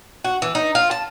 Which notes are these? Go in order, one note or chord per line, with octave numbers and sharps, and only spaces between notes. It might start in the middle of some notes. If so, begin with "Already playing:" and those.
F#4
E3
D#4
F4
A5